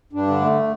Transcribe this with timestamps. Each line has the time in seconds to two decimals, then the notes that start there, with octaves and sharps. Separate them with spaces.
0.13 G2 D4
0.27 D3
0.41 A3